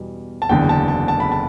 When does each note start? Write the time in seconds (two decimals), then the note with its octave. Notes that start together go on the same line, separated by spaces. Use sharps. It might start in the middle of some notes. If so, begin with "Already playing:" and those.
Already playing: E2 B2 G3
0.42 A5
0.49 F#1 E2 D3 G5
0.69 A5
0.88 A5
1.08 A5
1.20 B5
1.32 A5